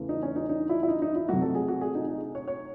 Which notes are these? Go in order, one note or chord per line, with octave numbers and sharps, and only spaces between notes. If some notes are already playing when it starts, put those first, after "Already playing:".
Already playing: E2 C#3 E3 A3
D#4
C#4
D#4
D#4
E4
E4
D#4
D#4
E4
C3 F#3 A3 F#4
A4
G#4
F#4
G#4
D#4
D#4
C#5
C#5